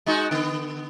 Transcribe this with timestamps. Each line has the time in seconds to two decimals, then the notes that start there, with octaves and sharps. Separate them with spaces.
0.06 G#3 D#4 F#4
0.31 D3 B3